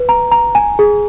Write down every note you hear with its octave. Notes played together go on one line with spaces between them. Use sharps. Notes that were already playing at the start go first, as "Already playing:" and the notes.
Already playing: B4
A#5
A#5
G#5
G#4